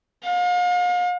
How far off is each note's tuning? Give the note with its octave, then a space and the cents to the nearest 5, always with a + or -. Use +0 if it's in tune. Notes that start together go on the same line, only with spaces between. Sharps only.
F5 +40